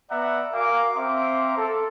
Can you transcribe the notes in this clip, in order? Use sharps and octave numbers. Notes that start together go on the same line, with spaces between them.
B3 D5 E5 F#5 A#5
F#4 A#4 F5 G#5 D6
C4 E5 F5 A#5 C6 D6
A4